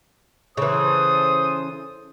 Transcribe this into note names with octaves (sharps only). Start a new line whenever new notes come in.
C#3 E3 A4 C5 D#6